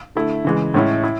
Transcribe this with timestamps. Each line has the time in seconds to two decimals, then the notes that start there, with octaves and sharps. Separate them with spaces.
0.15 D3 A3 E4
0.45 C#3 E3 G#3
0.74 A2 G#3 C#4 E4
1.04 E4